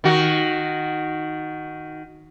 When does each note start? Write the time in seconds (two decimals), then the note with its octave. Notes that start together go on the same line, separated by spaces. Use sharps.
0.04 D#3 F#4